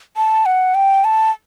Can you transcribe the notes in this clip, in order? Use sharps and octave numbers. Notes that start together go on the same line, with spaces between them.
A5
F#5
G5
A5